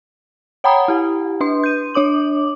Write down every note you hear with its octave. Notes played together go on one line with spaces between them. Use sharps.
C#5 F#5 G5 A#5 B5 D#6
E4 G4
D4 B4 C6
G6 D#7
D4 C#5 D6 F#7